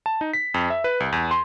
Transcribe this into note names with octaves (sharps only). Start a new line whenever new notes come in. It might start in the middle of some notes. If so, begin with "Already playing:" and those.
A5
D#4
B6
F2
E5
B4
C2
E2
C6